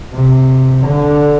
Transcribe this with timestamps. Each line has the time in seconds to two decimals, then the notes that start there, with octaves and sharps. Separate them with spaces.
0.14 C3
0.87 D3